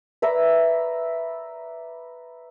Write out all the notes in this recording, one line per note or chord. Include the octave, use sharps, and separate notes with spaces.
B4 D5 E5 A#5